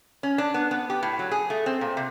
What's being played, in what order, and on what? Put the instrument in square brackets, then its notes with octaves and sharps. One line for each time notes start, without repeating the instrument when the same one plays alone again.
[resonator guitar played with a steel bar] C#4
D4
B3
B3
G4
A2
F#3
G#4
A3
C4
A#2
C3